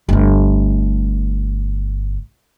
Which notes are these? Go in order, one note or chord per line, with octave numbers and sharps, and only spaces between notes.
G1 A3